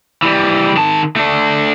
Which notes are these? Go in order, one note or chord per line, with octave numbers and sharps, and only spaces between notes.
E3 G3
D#3 A5
A3 D4